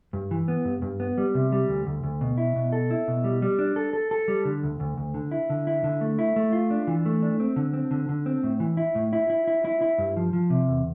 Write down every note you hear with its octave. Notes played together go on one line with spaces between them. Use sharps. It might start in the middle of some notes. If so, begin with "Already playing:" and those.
G2
E3
B3
G2
G2
B3
G3
C3
G3
D2
D2
D2
B2
E4
B2
A4
E4
B2
G3
G3
D4
A4
A4
A4
G3
D3
D2
D2
D2
D3
E4
D3
E4
D3
A3
E4
A3
F4
D4
E3
A3
D4
C4
D3
C4
D3
D3
C4
A2
E3
E4
A2
E4
E4
E4
E4
E4
G2
F3
F3
C3
E2